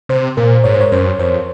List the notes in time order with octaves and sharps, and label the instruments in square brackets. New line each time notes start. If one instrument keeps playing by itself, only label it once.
[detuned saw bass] C3 [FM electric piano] C5
[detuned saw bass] A#2 [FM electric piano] A#4
[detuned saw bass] G#2 [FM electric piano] C#5
[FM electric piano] C5
C#5
[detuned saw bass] F#2 [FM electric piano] C5
[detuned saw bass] F2 [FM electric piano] C5